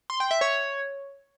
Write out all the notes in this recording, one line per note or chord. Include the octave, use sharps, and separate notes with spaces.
C6
G5
E5
C#5